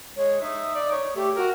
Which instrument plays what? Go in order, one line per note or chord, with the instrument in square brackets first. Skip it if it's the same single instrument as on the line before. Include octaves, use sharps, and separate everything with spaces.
[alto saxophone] G#3 [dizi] C#5
[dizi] D#4 [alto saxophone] E5
[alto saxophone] D5
C#5
[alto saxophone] A3 [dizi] G4
[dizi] F#4 [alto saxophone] A#4